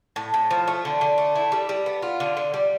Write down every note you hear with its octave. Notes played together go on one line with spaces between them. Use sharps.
A2
A2
F3
A3
D3
D3
A3
E4
G3
G3
B3
F4
D3
D3
G3